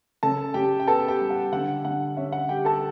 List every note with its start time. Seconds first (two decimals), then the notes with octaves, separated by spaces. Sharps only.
0.23 C#3 A4 A5
0.54 C#3 G4 G5
0.80 G5
0.87 B3 A4 A5
1.08 G4 G5
1.20 G3
1.30 F#5
1.53 D3 F#5
1.85 D3 F#5
2.17 C#4 E5
2.32 F#5
2.49 G3 G4 G5
2.65 A4 A5